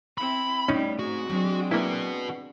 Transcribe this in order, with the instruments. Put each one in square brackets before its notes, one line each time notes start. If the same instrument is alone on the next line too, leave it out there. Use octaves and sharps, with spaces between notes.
[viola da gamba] C4 E4 [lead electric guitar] B5
[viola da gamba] A2 G3 [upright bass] A3 C4 [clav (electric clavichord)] C#4 D#4
[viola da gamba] G#2 G#3 [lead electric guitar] F#4
[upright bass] F#3 [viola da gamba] G#3 C4 D4
[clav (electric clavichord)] A#3 E4 [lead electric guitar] F#4 B4